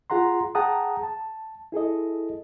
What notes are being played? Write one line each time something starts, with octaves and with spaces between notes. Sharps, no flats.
F4 G#4 F#5 A#5 C6
G#4 F#5 G5 A5 A#5 D#6
A5
E4 G#4 A4 D#5